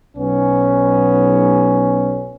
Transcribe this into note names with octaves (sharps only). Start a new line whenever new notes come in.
B1 B3 C#4